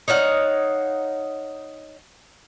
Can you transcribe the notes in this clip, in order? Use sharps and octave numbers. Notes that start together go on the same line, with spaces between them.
D#4 C#5 F5 F#5